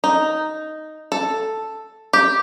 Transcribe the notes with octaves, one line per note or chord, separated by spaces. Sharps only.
D#4
A4
G4